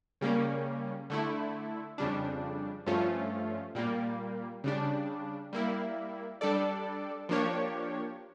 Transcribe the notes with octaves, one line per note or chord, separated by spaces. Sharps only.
C#3 G3 A#3 C#4
D3 A3 E4
F2 C#3 G3 D4
G2 F3 A3 C#4 F4
A#2 G3 A#3
C#3 G3 D4
G3 A#3 E4
G3 D4 A4 D5
F3 A#3 D4 G4 C#5